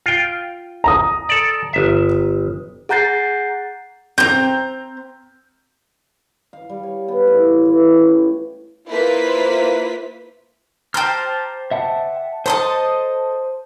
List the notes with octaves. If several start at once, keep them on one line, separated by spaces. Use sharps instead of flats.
F4 G5
A#5 D#6
A4 D5
G1 E5
G#4 F#5 A#5 G6 A6 C7
C4 A#5 G6
F5
G3
C#5
B3
A2
G5
E3
G4
C#4
G4
A#3 E4 F4 B4 C5 B6
G4 C5 A5 A#5 F6
E5 F#5 A5
A4 C5 D#5 A5 C6 D#6